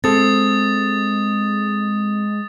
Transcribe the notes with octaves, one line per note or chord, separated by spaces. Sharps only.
G#3 C4 A4 D#6 A6